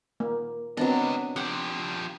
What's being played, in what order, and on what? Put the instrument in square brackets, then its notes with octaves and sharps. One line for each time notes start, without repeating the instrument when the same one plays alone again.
[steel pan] A#3
[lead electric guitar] C#2 D#5 [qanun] F#3 D4 [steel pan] B3 C4
[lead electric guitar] F3 G4 [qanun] F#5 G5